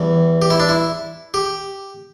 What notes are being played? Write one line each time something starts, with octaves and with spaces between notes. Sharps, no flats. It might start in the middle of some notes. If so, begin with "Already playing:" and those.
Already playing: E2 E3 G3
G4
E4
D4
E4
G4